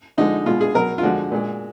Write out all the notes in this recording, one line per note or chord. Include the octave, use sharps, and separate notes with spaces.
D3 F3 G#3 D#4
B2 G#3 F4
G#4
B2 F#3 A#4
F4
D3 F3 G#3 F#4
A#2 G#3